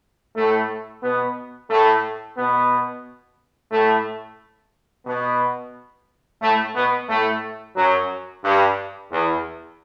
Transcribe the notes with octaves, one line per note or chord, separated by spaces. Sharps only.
A2 A3
B2 B3
A2 A3
B2 B3
A2 A3
B2 B3
A2 A3
B2 B3
A2 A3
F#2 F#3
G2
E2